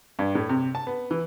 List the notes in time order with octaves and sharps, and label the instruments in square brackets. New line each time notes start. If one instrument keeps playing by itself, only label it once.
[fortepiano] G2
A2
C3
A5
B3
E3